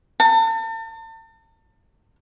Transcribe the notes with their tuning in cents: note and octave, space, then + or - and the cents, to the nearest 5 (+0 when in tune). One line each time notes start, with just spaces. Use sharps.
A5 +40